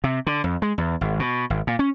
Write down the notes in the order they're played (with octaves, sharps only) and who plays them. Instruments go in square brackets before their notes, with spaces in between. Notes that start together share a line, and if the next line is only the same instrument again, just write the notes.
[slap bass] C3
D3
F2
G#3
E2
G#1
B2
G#1
A#2
C#4